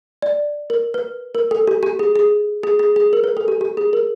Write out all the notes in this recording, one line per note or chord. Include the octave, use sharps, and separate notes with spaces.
D5
A#4
B4
A#4
A4
G4
G4
G#4
G#4
G#4
G#4
G#4
A#4
B4
A4
G4
G4
G#4
A#4